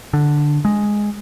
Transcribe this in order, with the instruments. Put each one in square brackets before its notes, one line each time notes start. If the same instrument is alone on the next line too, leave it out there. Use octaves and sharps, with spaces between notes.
[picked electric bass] D3
G#3